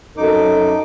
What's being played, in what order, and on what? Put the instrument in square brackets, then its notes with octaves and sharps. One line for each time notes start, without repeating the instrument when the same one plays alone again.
[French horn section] F#2 A4 [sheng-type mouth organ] D#4 D6